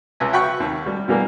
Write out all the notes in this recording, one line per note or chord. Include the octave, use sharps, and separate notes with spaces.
C#2 E5 G#5
E5 F#5 G5 B5 C#6
D#2
G3
B2 E3 G3 A#3